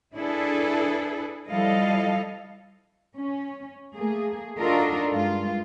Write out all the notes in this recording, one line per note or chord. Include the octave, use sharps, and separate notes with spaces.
D4 E4 G#4 A4 B4
F3 G3 E4 A4 D#5 F5
C#4
A3 A#3 G#4
D4 D#4 F4 F#4 A4 A#4
G2 G#3 F4